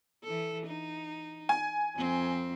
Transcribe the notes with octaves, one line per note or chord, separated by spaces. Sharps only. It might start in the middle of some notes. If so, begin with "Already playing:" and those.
E3 A4
D#4
G#5
F2 C4